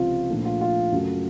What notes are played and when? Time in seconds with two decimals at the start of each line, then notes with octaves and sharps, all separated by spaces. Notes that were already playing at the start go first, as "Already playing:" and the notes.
Already playing: C#2 C3 F3 F4
0.30 A#1 A#2 F3 A3
0.45 F4
0.61 F4
0.92 F#2 C#3 F#3 A3